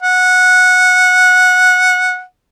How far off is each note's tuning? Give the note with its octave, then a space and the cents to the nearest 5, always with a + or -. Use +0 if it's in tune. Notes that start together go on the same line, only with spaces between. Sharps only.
F#5 -15